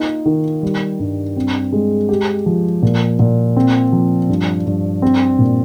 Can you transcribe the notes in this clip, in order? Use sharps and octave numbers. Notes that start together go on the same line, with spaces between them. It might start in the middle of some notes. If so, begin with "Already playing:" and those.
Already playing: A#3 D#4 F4
D#3
G3
G2
C4
G#3
G4
F3
A#2
A#2
C4
F3
G2
G2
C4
A#2